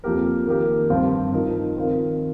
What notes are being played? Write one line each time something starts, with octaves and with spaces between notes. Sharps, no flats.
F2 F3 A#3 G4 A#4
D#3 A#3 G4 A#4
G2 F3 C4 F4 A#4
F3 D#4 A#4
D#3 C4 F4 A#4